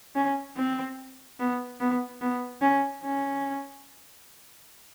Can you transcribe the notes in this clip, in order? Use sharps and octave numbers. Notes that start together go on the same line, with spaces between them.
C#4
C4
B3
B3
B3
C#4
C#4